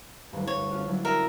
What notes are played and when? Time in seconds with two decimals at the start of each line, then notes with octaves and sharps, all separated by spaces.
0.32 F#1 D2 G2
0.47 C#5
0.71 C#4 F4 F#4
0.87 F#3 D4 E4
1.05 D4 F#4 A4 A#4 E5